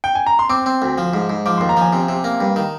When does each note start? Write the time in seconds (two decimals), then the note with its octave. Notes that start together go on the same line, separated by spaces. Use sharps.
0.04 G5
0.15 G#5
0.26 A#5
0.39 C6
0.50 C4 D6
0.66 C4
0.82 D2
0.98 F3
1.14 G#2
1.30 G#2
1.46 F3 D6
1.58 D#2 C6
1.69 A#5
1.77 F3 G#5
1.93 C3
2.09 C3
2.24 A#3
2.41 G2
2.56 D#3